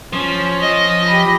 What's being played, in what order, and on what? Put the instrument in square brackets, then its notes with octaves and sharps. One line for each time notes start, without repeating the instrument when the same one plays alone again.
[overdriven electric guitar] F3 [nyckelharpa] C#4
[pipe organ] D#5
[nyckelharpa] G4 B5